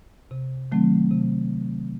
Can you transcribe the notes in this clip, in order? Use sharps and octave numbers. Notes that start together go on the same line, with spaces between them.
C3
D#3 F#3 A3 C4
C3